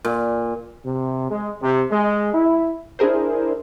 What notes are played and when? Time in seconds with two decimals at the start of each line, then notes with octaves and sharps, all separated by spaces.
0.05 A#2
0.85 C3
1.30 G#3
1.62 C3
1.91 G#3
2.34 E4
2.99 D4 E4 G#4 A#4 C5